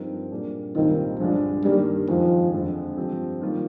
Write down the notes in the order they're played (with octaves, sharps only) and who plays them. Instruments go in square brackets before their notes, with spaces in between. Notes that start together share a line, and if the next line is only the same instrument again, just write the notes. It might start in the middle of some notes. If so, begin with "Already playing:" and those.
Already playing: [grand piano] G2 F3 C4 D#4 A#4
A#2 G3 A#3 D4 G#4
[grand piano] C2 A#2 G3 C4 F4 [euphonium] D#3
[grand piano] G2 D3 G#3 D4 [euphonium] F3
[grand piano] G2 D#3 A#3 [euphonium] G3
[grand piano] F2 D#3 G#3 [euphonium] F3
[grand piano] F2 D3 F3 G#3 C4
G2 F3 C4 G4
D#3 G3 A#3 F4